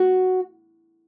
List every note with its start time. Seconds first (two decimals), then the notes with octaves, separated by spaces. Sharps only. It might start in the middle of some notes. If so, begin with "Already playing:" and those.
Already playing: F#4